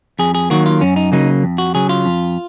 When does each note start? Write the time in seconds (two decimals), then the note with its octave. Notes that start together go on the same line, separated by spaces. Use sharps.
0.19 F2 G#4
0.35 G#4
0.50 D#3 F#3 A#3 F#4
0.66 F4
0.81 F#2 C#4
0.96 D#4
1.12 C#3 F#3 A#3 D#4
1.44 F2
1.58 F#4
1.75 C#3 F#3 G#4
1.89 F4
2.06 F2